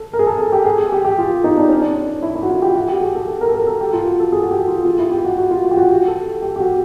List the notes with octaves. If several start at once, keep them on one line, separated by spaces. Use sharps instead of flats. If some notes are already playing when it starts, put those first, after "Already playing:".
Already playing: A4
A#4
G#4
A4
G#4
G4
G#4
G#4
G4
G4
F4
D#4
D4
C#4
D4
E4
E4
F#4
F4
G4
F#4
G4
G#4
A4
A4
A#4
A4
A#4
A4
G4
F4
F#4
A4
G#4
F#4
G4
F4
F4
E4
G4
F#4
F#4
F4
F4
G4
F#4
G4
A4
G4
G4
F#4